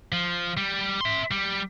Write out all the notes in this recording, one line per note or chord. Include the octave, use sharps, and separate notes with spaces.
F3
G3
E5 C6
G3